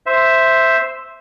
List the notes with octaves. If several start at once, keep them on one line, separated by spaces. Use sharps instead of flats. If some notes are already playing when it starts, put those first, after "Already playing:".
C5 E5